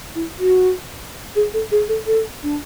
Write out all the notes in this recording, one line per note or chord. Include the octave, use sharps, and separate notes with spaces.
E4
F#4
G#4
A4
G#4
A4
A4
D4